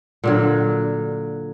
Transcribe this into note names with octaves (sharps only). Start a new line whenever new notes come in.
A#2 D3 F#3